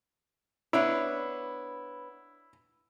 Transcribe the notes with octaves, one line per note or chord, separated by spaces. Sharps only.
B3 D4 E4 C#5